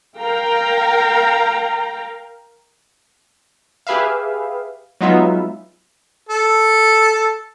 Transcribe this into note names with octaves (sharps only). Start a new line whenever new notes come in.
A#4 F5 G5 A#5
G4 G#4 B4 E5 F5
F#3 G#3 B3 D#4 F4 E5
A4